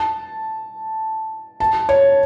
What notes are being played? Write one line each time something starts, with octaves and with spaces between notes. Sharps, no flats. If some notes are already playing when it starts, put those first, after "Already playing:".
Already playing: A5
A5
C#5